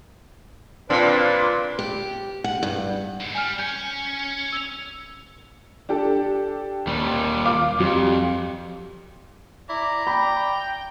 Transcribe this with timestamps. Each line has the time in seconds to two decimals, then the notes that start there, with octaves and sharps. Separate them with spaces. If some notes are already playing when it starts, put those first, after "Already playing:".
0.90 A#2 C4 D4 F4 B4
1.79 G4
2.44 F#5
2.63 G2
3.20 G#2 D3
3.35 G3 G#5 F6
3.59 C#4 G#5 G6
4.52 E6 F7
5.89 D4 G4 A4
6.87 D#2 G3
7.45 F5 D6
7.80 F2 F#3 G3
9.69 E4 D5 A#5
10.07 G5 B5